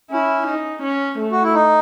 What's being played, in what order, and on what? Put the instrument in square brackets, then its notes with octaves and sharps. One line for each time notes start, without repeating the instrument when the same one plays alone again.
[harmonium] C#4 [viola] E4
[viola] D#4
C#4
A3
[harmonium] F#4
E4
D#4